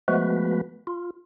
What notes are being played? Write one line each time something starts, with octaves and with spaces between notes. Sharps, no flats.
F3 G#3 A3 B3 F#4 B4
F4